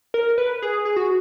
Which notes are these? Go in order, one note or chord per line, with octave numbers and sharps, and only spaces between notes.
A#4
B4
G#4
G#4
F#4